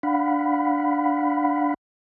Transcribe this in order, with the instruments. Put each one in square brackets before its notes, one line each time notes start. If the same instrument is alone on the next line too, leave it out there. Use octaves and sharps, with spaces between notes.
[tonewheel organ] D4 F5 F#5 B5